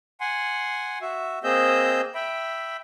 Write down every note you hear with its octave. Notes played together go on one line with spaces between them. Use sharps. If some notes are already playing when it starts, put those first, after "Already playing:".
F#5 G#5 C6
F#4 E5
A#3 C4 G#4 D#5 E6 G6
E5 G5 B5